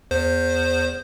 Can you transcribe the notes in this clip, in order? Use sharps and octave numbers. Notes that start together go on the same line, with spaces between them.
E2 C5